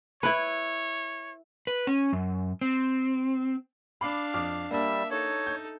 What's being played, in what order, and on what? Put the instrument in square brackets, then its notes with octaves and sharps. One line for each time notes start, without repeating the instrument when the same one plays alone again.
[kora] E4 B4 [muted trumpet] C#5
[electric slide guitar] B4
C#4
F#2
C4
[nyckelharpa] D4 F5 [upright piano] B5 D6 C7
[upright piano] F2 D6 F6
[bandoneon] G3 [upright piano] A#3 D4 [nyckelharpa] E5
[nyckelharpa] D#4 A4 [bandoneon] C#5
[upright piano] G6